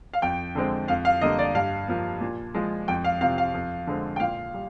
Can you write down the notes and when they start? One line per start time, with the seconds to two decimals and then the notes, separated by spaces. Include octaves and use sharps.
0.13 F5
0.22 F2 G5
0.55 D3 G#3 C4
0.88 F2 F5
1.05 F5
1.21 D3 G3 A#3 D#5
1.39 D5
1.55 G2 F5
1.88 F3 A#3
2.21 A#2
2.54 F3 G#3
2.88 F2 G5
3.04 F5
3.21 C3 F3 F5
3.38 F5
3.54 F2
3.87 D3 G#3 C4
4.16 G5
4.20 A#2 F5
4.54 G3